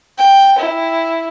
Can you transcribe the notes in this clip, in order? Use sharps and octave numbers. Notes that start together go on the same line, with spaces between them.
G5
E4